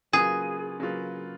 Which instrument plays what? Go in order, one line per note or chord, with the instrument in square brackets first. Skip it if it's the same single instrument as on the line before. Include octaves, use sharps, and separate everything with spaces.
[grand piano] C#3 F#3 A#3 F4 B4 [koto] G#4
[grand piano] C#3 F#3 A#3 F4 B4